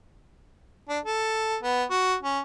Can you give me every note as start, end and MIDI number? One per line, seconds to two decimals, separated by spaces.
0.89 0.99 62
1.05 1.57 69
1.63 1.84 59
1.90 2.16 66
2.23 2.40 61